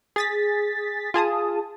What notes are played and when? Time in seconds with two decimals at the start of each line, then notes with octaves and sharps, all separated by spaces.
0.16 G#4 A6 B6
1.14 F4 G#4 A5 D#6